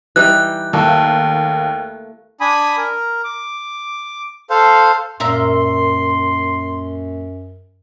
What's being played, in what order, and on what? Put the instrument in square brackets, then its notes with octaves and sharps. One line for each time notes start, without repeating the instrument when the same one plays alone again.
[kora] E3 G3 D#4 [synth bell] F#6
[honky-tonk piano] D#2 [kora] A3 A#3
[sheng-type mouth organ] D4 G#5 B5 D#6
A#4
D6
A4 C5 F5
[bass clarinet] F#2 [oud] A#2 A#4 E5 [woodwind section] C6